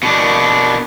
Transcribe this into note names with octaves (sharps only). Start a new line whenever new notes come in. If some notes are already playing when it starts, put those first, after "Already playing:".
B2 D4